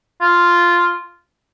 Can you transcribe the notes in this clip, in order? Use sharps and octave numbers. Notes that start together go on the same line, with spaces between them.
F4